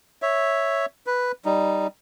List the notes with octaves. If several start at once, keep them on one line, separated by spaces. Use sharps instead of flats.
C#5 E5
B4
G3 D#4